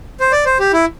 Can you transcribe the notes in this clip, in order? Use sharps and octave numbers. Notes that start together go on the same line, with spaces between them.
C5
D5
C5
G4
E4